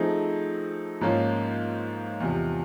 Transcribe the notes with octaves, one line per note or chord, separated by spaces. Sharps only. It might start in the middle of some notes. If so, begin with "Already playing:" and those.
Already playing: F3 A3 C4 D#4 G#4
G#2 F3 A#3 C#4 F4
E2 C3 F3